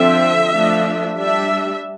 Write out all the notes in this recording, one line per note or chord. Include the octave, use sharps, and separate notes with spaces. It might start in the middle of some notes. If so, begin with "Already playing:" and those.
Already playing: D3 F3 C4 E5
F3 A3 D4
G3 D4 E5